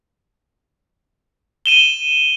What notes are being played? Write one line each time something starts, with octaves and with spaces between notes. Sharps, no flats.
D#7 E7 G7